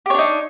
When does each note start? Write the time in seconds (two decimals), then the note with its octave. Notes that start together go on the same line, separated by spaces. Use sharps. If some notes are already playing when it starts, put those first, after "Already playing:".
0.06 G4
0.10 C#5
0.14 D4
0.19 D#4